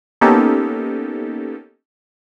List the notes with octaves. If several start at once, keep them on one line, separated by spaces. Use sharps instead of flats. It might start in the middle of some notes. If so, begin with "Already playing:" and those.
A#3 B3 C#4 D#4 G4 A4